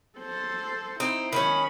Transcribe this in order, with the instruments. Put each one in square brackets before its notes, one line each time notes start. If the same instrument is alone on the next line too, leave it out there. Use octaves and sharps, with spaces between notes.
[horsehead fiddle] A4 C5
[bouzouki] C4 D#4 [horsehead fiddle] E4
[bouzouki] D#3 C#4 [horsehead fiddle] B5